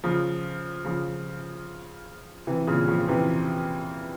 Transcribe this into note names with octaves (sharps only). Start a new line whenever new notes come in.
C#3 F3
C#3 F3
C3 E3
A#2 C#3
C#3 F3
C3 E3